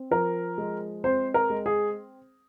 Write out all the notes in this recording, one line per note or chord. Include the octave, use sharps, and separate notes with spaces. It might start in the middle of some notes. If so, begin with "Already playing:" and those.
Already playing: C4
F3 A#4
G#3
C4 C5
A#4
G#3
G#4